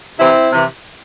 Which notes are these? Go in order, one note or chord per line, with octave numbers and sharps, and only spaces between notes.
C3 E3 C4 E4
C3 E3